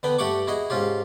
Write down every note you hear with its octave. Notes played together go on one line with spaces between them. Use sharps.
D3 B3 B4 G5
G2 A3 G4 F#5 C#6 D6
E4 F#4 G#4 D#5
G#2 C#4 F4 G4